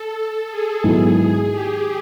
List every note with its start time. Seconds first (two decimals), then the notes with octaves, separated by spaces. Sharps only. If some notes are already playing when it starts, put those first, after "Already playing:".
Already playing: A4
0.16 A4
0.50 G#4
0.84 G#2 D#3 F#3 B3 E4
1.51 G4